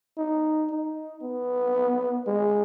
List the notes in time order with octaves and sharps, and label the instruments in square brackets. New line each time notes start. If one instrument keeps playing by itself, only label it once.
[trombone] D#4
D#4
B3
G#3